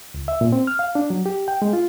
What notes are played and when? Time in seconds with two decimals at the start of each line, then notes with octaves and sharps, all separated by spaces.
0.14 C#2
0.28 E5
0.41 A#2
0.52 C4
0.67 F6
0.79 F5
0.95 D4
1.10 F#3
1.26 G4
1.48 G5
1.62 G#3
1.73 F4